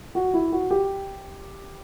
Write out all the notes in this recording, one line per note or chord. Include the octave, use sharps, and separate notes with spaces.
F#4
E4
F#4
G4